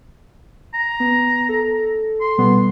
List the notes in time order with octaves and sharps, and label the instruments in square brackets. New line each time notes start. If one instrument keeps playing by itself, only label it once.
[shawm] A#5
[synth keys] B3
A4
[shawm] C6
[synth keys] B2 G3 B3